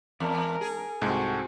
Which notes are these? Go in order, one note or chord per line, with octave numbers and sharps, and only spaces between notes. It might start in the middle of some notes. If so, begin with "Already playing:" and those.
E2 G#2 E3 A#4 A5
G#4
C2 G#2 G#3 C4 F#4 A4